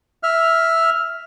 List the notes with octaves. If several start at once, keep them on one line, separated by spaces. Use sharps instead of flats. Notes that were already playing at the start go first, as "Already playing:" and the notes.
E5 F6